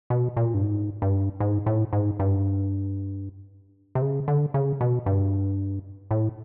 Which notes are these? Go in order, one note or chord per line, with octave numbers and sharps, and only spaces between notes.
B2
A#2
G2
G#2
G2
G#2
A2
G#2
G2
C3
C#3
D3
C#3
B2
G2
A2